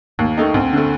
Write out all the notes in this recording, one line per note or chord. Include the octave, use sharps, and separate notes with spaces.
D#2 A#3
D#3 A3 D#4
D2 C4
D3 A3